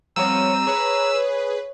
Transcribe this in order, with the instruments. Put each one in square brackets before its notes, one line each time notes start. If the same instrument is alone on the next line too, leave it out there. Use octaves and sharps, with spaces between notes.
[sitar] F3 B3 C#5 [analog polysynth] G3 C4 D#7 [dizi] A#5 [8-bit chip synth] E6
[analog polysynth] G#4 B4 [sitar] C#5